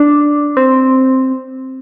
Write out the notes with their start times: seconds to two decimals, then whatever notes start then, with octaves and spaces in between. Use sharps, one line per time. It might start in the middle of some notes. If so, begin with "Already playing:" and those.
Already playing: D4
0.57 C4